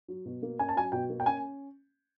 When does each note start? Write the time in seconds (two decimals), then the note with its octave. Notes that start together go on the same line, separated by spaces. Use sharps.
0.08 F#3
0.26 B2
0.42 A#3
0.59 C#4 G#5
0.69 A5
0.76 F#3 G#5
0.92 B2 G5
1.10 A#3
1.20 G5
1.26 C#4 G#5